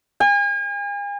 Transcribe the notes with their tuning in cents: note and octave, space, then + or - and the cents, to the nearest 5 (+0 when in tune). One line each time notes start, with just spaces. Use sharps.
G#5 -40